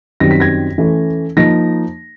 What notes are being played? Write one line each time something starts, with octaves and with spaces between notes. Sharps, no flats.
F#2 D#3 G3 C4 A#6
B6
G#6 A#6
E3 A3 C#4
F3 A#3 D#4 A#6